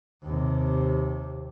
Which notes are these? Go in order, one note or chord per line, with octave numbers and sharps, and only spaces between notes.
D#2 C3